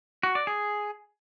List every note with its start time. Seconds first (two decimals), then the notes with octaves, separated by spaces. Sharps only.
0.23 F#4
0.35 D5
0.47 G#4